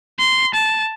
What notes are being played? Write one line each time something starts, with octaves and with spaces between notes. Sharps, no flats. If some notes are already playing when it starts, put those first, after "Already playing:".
C6
A5